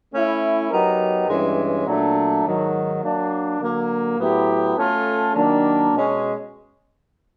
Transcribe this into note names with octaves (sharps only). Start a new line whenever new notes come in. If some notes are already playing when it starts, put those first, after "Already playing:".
A3 C#4 E4
F#3 B3 D#4 G4 A#4
G2 E3 G#3 C#4
A#2 F#3 A3 D4
G#2 D#3 F#3
F#3 A#3 D4
D3 F#3 A#3
A2 F#3 B3 E4 G4
A3 C#4 F4 A4
D#3 F#3 A#3 D4
B2 G#3 C#4